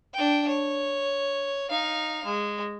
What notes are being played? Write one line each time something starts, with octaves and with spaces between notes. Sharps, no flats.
D4 G5
C#5
D#4 F5
G#3